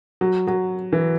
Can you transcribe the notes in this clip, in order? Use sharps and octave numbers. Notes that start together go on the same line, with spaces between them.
F#3
F#3
E3